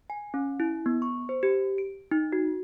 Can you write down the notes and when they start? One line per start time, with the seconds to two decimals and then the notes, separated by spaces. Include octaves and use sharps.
0.10 G#5
0.34 C#4
0.60 E4
0.86 B3
1.02 C#6
1.29 C5
1.43 G4
1.78 D7
2.11 D#4
2.33 F#4